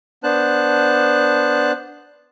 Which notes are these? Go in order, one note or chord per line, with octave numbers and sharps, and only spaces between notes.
B3 D4 C5 A5 F#6